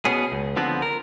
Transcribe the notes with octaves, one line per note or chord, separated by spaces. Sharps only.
B2 B3 C#4 G#4
C#2
D3 F3 B3 C4
A#4